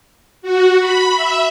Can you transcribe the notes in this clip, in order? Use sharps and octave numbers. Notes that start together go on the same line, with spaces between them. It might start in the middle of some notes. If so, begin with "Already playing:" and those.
F#4
B5
E5